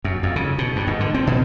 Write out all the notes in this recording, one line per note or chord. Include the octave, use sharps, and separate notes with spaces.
F#2
F2
C#3
B2
G2
G#2
D3
C4
B2